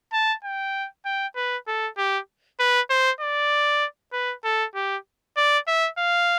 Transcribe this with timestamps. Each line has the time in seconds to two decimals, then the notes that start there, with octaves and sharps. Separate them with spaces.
0.13 A5
0.44 G5
1.05 G5
1.36 B4
1.67 A4
1.98 G4
2.60 B4
2.90 C5
3.21 D5
4.13 B4
4.44 A4
4.75 G4
5.37 D5
5.68 E5
5.98 F5